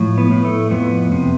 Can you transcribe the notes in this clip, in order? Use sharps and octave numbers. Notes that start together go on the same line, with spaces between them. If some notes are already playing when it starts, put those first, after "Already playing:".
Already playing: A2 F3
B3
A2
A3
F2 B3
C3